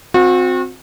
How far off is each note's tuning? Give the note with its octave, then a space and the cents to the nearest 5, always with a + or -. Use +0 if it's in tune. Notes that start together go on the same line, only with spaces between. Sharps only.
C4 +0 F#4 -35